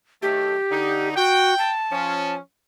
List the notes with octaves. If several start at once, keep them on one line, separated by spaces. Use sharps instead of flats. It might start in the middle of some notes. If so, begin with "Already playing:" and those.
D#3 F#3 A3 G4
D3 D#4
F#4 G5
A5
F3 C#4